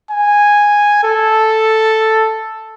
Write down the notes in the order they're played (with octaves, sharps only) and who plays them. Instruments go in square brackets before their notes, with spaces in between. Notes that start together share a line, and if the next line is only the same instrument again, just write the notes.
[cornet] G#5
A4